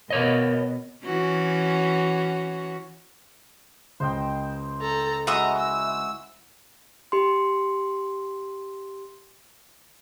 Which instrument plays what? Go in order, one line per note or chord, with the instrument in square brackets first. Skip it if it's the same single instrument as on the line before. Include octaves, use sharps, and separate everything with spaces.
[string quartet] B2 [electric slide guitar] A#4 C#5 D#5
[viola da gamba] E3 C#4 F#4
[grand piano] C#2 [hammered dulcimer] C5 D#5 G5
[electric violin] A4 A#5
[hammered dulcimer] G#3 E4 F#4 [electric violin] D#5 A#5 [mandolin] E5 D#6
[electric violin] E6
[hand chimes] G4 C6